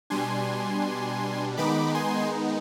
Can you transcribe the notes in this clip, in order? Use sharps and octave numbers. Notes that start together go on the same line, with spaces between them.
B2 G3 D4 G#5 C6
D#3 G#3 B3 D#4 B5 D6
G#5 C6